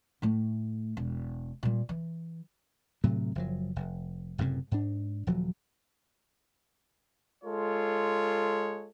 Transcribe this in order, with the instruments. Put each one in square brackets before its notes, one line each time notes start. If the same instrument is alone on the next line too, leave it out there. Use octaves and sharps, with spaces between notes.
[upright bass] A2 A3
E1
A#2 G3
E3
[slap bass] A2 C3 F#3 A3
F#1 F3 F#3
F1
F#1 F#2 A2 C3
G#2 D4
D#1 F3 F#3
[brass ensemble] G#3 F4 A4 C#5